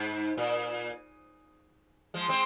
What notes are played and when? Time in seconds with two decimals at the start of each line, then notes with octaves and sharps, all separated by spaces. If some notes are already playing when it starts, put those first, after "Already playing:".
Already playing: G#2
0.38 A#2
2.14 F3 G#3
2.29 G#3 C4